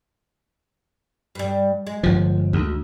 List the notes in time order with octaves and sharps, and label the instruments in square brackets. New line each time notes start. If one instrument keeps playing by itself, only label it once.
[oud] G2 G3
G#3
[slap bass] G1 F3
D2